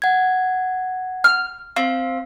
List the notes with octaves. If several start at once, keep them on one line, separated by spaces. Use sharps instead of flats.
F#5 G#6
F6
C4 F5